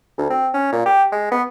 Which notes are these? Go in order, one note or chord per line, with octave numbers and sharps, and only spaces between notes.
D2
C4
C#4
A#2
G4
G#3
B3